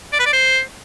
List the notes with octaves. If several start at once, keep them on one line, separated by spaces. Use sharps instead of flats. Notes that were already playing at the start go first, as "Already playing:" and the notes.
D5
B4
D5
C5